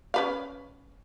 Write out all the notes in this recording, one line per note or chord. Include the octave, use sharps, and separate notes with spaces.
C#4 B4 F5